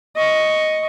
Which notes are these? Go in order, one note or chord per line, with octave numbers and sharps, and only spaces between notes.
D#5 C#6